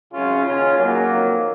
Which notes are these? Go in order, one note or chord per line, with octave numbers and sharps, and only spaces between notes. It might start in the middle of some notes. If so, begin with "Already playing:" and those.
G#1 F#2 C#3 C#4 F4
D#2 C#3 C#4 F4
D#2 C#3 F#3 A#3
F2 D#3